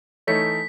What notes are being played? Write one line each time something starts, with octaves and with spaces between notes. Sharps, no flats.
E3 A3 D#4 A4 C#5 B6